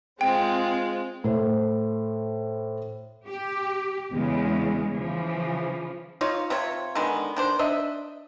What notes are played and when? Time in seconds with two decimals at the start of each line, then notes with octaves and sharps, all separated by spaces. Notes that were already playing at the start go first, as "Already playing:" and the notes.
0.21 G#3 C4 F4 G5
1.24 A2 C5
3.27 G4
4.12 E2 C#3 G#3
4.95 C#3 E3 F3
6.21 D#4 F4 C#5 F5
6.50 C3 F4 C#5
6.95 D3 D#3 G#3 B3
7.36 D#3 D4 C5
7.59 D4 D#5 E5